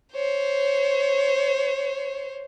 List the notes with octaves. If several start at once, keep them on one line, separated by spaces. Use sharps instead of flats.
C5 C#5